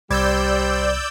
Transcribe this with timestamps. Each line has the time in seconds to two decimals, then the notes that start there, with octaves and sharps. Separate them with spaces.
0.10 C2 G3 C5 D5 B5 E6 G6 G#6